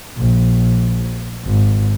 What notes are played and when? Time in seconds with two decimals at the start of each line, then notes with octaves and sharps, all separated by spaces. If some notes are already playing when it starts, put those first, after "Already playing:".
0.17 A#1
1.45 G#1